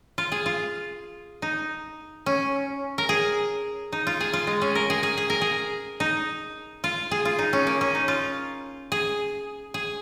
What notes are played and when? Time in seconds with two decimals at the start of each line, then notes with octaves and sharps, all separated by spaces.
0.18 F4
0.32 G#4
0.46 F4
1.42 D#4
2.26 C#4
2.98 A#4
3.09 G#4
3.93 D#4
4.07 F4
4.21 G#4
4.33 F4
4.47 G#3
4.62 C#4
4.75 A#4
4.90 G#4
5.03 G#4
5.18 G#4
5.30 A#4
5.41 G#4
6.00 D#4
6.84 F4
7.11 G#4
7.25 F4
7.39 D#4
7.53 C#4
7.67 A#3
7.81 C#4
7.95 D#4
8.08 F4
8.92 G#4
9.74 G#4